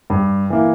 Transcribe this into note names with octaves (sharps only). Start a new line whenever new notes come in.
G2
E3 A#3 E4